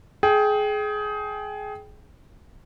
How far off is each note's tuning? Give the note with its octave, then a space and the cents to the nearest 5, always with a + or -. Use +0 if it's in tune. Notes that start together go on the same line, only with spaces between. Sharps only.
G#4 +20 G5 +0